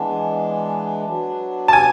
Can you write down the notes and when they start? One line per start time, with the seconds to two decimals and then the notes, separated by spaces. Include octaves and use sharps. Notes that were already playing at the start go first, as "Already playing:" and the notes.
Already playing: E3 G#3 B3 D4
1.05 F#3 B3 D4
1.68 A5
1.73 G#5